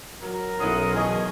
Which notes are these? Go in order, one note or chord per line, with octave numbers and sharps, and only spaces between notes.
F#3 A#4
B1 F#3 C#4 E4 F#5 C6 D#6
B2 D#3 E3 G#4 D#5 C#6